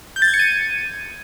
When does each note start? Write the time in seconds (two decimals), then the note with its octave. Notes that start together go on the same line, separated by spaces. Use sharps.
0.16 G6
0.22 A6
0.28 G#6
0.34 C#7
0.39 D#7